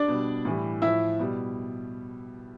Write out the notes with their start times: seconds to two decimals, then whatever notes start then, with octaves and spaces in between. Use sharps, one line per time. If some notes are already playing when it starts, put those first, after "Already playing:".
Already playing: D4 D5
0.08 B2 G3
0.45 A2 E3 G3
0.82 A2 F3 E4 E5
1.19 B2 G3